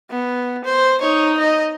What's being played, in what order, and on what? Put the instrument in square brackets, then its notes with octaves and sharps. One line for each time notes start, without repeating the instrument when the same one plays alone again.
[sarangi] B3
C5
[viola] D#4 [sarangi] C#5
[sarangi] D#5